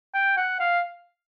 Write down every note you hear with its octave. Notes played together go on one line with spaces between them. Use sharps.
G5
F#5
F5